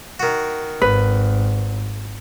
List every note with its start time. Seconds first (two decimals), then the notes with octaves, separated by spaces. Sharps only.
0.20 D#3 F#4
0.82 G#1 B4